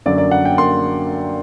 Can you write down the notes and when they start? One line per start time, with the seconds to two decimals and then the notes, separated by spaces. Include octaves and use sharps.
0.06 F#2 D3 F#3 A#3 D5
0.18 D5
0.31 F#5
0.45 G5
0.58 A#3 C6